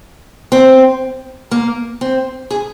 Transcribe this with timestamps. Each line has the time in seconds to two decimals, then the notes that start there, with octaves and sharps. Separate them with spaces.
0.52 C4
1.51 A#3
2.01 C4
2.50 G#4